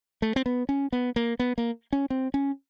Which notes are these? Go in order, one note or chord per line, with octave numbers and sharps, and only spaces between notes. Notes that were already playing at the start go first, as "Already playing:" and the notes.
A3
C4
B3
C#4
B3
A#3
B3
A#3
C#4
C4
C#4